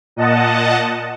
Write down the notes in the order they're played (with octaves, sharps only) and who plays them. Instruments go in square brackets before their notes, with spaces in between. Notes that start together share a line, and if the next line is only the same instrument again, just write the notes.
[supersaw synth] A#2 D#5 F#5 A5